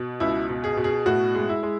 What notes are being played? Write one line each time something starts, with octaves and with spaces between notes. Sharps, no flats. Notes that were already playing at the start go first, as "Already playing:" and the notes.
Already playing: B2
C#2 E4
B2
G#4
B2
G#4
A2 F#4
G#3
E4
G#3